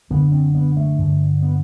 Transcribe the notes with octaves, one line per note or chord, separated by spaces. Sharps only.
F#2 D3 B3
C4
B3
A3
G2 D3
B3